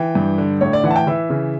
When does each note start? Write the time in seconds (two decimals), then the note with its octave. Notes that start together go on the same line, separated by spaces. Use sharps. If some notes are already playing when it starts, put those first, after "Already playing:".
Already playing: E3 G5
0.15 G2
0.38 D3
0.61 A2 C#5
0.73 D5
0.84 E3 F#5
0.91 A5
0.96 G5
1.07 E3 E5
1.30 C#3